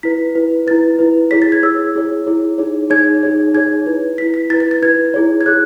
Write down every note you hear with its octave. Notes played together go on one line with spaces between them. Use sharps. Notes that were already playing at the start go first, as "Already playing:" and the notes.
E4 B4 B6
E4 B4
E4 B4 A6
E4 B4
E4 G#4 C#5 B6
A6
G#6
E4 G#4 C#5 E6
E4 G#4 C#5
E4 G#4 C#5
D#4 G#4 C#5
D#4 G#4 C#5 G#6
D#4 G#4 C#5
D#4 G#4 C#5 G#6
E4 B4
E4 B4 B6
B6
E4 B4 A6
A6
A6
E4 B4 G#6
E4 G#4 C#5
G#6
G#4 C#5 F#6